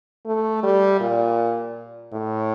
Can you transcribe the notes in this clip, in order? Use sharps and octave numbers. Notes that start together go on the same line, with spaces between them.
A3
G3
A#2
A2